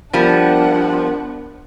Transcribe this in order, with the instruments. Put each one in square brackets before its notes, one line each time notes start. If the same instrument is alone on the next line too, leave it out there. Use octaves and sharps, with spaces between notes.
[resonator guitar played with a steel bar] F3 G3 [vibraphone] B3 A#4 [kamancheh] D4 F#5